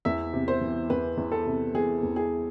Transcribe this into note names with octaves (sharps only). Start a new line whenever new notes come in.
E2 E5
C3
C5
E3
E2 B4
E2
A4
C3
E3 G#4
E2
G#4